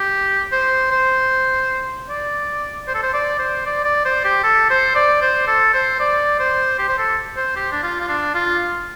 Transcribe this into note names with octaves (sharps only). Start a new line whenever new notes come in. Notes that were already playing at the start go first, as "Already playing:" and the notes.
Already playing: G4
C5
C5
D5
C5
A4
C5
D5
C5
D5
D5
C5
G4
A4
C5
D5
C5
A4
C5
D5
C5
G4
C5
A4
C5
G4
D4
F4
F4
D4
F4